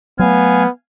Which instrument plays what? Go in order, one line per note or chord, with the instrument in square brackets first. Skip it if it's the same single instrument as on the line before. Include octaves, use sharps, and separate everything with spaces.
[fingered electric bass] F#3 A3 [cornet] B3 [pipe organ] F5 G#5